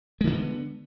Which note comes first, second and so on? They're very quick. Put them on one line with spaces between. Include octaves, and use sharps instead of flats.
G#3 D#3 D3 B3